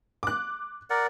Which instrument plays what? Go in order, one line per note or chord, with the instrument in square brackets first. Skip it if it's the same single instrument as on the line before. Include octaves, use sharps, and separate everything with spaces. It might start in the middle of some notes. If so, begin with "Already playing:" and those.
[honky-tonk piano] D6 F#6
[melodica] A#4 D5 F#5